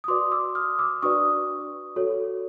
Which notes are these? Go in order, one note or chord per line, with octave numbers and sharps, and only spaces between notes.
D#6
F#4 B4 D5 C6 D6
D6 E6
D#6 F6
D6 E6
D4 F#4 B4 D5 C#6 D#6
F#4 A4 C#5